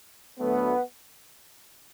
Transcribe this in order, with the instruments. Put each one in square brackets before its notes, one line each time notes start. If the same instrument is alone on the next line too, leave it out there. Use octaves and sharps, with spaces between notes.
[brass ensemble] D2 D3 F#3 A3 B3